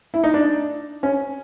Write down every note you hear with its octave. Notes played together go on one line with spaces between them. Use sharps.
E4
D#4
D4
C#4